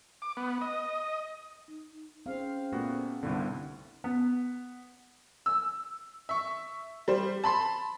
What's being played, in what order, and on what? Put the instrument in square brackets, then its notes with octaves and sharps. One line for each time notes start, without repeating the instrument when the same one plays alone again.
[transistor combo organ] D6
B3
D#5
[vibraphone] D#4
[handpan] C4 F5 [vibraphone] C#4 G#4 C5
[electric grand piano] A#2 B3 F#4 [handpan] A3
[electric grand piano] C2 G2 D3 [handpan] B3 C4 E4 [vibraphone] D#4 D5
[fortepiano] B3
[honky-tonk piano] E6
E5 C#6
G3 C5
A5 B5 C6